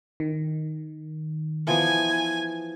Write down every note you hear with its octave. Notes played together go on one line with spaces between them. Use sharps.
D#3
E3 F3 B3 G#5